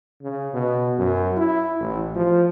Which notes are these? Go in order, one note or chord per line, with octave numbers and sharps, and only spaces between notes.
C#3
B2
F#2
E4
A1
F3